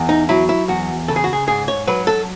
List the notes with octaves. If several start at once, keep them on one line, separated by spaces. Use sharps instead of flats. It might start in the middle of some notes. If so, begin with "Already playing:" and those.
Already playing: E2
D#4
F#3 E4
E4
E2 F#4
C#3 A4
G#4
F#4
G#4
G#2 G#4
C#5
F#3 B4
A4